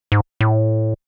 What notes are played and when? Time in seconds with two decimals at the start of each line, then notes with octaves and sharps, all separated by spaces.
0.12 G#2
0.41 A2